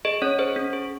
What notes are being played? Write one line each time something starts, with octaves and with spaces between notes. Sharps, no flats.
G#4 D#5
C#4 C#5
G#4 C5
C#4
G#4